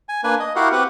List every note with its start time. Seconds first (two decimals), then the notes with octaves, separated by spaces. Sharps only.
0.09 G#5
0.24 A#3 D4 B4 G#5
0.40 D#5
0.56 E4 F#4 G4 A#4 F5 F#5
0.72 C4 G4 B4 F#5